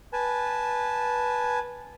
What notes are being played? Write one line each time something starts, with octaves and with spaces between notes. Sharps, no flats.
B4 G#5 A5